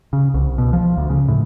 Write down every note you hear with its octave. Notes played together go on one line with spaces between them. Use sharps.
C#3
C2
B2
F3
D2
C#3
A2